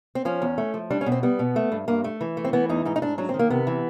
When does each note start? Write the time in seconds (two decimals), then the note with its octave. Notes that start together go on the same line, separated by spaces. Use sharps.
0.15 C4
0.25 F3 C#4
0.42 E2
0.58 A3
0.74 F3
0.91 G3 D4
1.01 C#4
1.06 B2
1.12 C4
1.23 G3 B3
1.39 B2
1.56 A3
1.72 G2
1.88 G2 A#3
2.04 A3
2.21 E3
2.37 A3
2.44 C4
2.53 E3 B3
2.69 E2 D#4
2.85 G#2 D#4
2.96 D#4
3.02 G#2 D4
3.18 F#3 D4
3.29 C4
3.34 D#3
3.39 A#3
3.50 C3 B3
3.67 E3